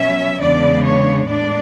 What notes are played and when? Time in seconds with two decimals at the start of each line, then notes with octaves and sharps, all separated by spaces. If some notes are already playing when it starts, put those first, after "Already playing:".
Already playing: B2 F#3 C#4 E5
0.38 E2 C#3 G#3 B3 D4 D5
0.82 C#5
1.26 A2 G#3 B3 D4 D5